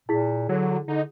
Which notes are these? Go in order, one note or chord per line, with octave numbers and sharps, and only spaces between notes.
A#2 E4 G#4 B6
D3 F#3
D3 D#4